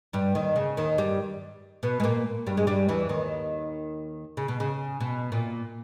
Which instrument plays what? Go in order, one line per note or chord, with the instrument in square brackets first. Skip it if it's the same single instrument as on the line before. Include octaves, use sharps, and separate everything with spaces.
[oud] G2 G3
D#2 D#3
C#3
D#2 D#3
G2 G3
B2 B3
G#3
A#2 A#3
G2 G3
G#3
G2 G3
E2 E3
D#2 D#3
C#3
B2
C#3
B2
A#2